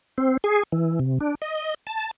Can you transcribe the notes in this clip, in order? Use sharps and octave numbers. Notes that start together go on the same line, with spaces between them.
C4
G#4
E3
C3
D4
D#5
A5